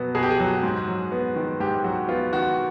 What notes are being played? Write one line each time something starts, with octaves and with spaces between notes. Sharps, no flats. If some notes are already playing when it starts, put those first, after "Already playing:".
Already playing: B2 F#3 B3
B2 G#4
G4
G#4
F#3
G#2
F#3
B3
D#3
G#2 G4
F#3 F#4
B3 F4
D#3 F#4